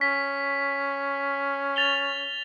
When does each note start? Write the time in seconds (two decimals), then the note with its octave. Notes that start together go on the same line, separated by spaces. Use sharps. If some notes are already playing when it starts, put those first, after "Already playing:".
0.01 C#4 B6
1.76 A6 F7 G7